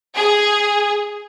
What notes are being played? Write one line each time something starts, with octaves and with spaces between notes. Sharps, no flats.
G#4